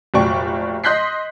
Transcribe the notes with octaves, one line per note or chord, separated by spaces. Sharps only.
F1 A#2 F#3 D5 G5 C#6
D#5 C6 F#6 G6 B6 C7